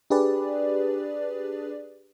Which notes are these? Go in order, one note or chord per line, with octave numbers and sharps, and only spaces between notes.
D4 G4 G#4 B4 D5